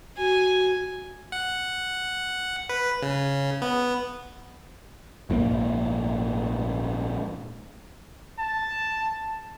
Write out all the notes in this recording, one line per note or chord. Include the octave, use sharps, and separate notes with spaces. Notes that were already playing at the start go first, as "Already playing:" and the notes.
F#4 G#5
F#5
B4
C#3
B3
A#1 G#2 F3 A#3
A5